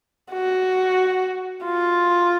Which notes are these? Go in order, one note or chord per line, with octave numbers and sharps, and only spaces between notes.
F#4
F4